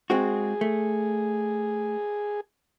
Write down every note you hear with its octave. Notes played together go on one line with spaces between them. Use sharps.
G#3 C4 F#4 G#4
A3